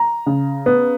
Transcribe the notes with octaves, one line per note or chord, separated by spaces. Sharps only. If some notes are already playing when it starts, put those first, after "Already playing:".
Already playing: A#5
C#3
B3